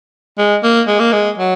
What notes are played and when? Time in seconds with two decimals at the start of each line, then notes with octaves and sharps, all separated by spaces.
0.38 G#3
0.64 A#3
0.87 G#3
1.00 A#3
1.12 G#3
1.38 F#3